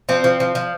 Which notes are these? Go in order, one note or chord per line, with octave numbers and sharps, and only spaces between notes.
F3 C4
F3
F3
F3